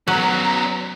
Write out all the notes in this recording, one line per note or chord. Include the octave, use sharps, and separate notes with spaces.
F#3 B3 C#4 A#5